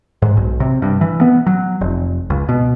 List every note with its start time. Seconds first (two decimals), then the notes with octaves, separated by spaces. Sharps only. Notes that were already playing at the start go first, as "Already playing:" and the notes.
0.22 G#2
0.37 B1
0.60 C3
0.82 G2
1.01 E3
1.21 B3
1.47 F#3
1.81 F1
2.30 C#2
2.49 B2